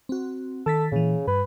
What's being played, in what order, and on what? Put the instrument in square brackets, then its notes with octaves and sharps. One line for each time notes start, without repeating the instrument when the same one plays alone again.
[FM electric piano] C4 F#4
[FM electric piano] D#3 A6 B6 [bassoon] A4
[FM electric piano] A#2 E3 [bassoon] C#3
[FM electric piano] G2 [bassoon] B4